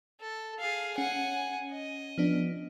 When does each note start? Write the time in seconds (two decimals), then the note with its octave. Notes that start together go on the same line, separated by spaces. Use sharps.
0.21 A4
0.59 G#4 F5
0.98 C#4 F#5 G#5
1.71 D#5
2.18 F3 B3 D4